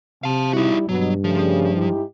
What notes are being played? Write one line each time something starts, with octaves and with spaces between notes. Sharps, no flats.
C3 F5 A5
G3 D#4 E4 F#4
G2 B2 F#3
C#3 F3 G3 A3
G#2 E4 G4